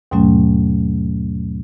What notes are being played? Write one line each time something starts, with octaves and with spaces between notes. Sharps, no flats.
D#2 G#2 B2 F#3 A3 C#4